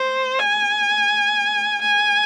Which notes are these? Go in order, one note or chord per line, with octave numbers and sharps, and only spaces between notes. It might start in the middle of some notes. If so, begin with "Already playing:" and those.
Already playing: C5
G#5
G#5